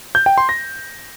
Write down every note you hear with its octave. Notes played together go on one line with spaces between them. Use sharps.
G6
G5
C6
A#6